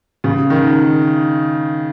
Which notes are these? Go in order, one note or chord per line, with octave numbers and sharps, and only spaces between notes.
C#3
D#3